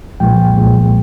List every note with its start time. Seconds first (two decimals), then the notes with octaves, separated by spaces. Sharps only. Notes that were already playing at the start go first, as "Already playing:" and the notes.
0.20 C2 A#2 F3 G#3 G5
0.56 C2 A#2 F3 G#3